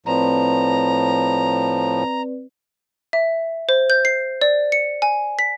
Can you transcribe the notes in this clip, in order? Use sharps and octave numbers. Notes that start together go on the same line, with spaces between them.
A2 F3 C4 B4 D5 A#5
E5
C5
G6
C7
D5
C#7
G#5
B6